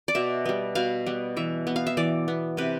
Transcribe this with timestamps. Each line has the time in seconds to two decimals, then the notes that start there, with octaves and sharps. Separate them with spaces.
0.08 D5
0.15 B2 E5
0.45 G3 B3
0.75 B2 F5
1.06 G3 B3
1.37 E3 E5
1.67 B3
1.76 F5
1.87 E5
1.97 E3 D5
2.28 B3
2.57 C3 B4